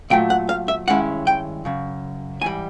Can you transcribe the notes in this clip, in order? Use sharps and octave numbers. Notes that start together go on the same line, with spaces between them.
A#2 F#3 A3 G5
F#5
F5
E5
G2 D#3 G#3 C#4 E4 F#5
G5
F#2 C#3
G#2 E3 G3 G#5